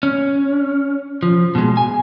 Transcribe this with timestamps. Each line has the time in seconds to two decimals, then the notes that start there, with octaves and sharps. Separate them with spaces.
0.03 C#4
1.23 F3
1.55 B2 G#3
1.77 G#5